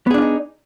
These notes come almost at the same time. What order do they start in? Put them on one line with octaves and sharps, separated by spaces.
B3 G#4 D4 F4 D#4